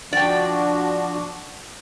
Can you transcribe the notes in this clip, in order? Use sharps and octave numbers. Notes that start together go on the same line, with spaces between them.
F3 D4 F#4 D5 G5